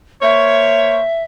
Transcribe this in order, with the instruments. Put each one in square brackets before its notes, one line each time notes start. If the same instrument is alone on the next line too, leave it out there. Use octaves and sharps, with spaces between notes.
[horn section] A#3 C5 C#5 [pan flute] E5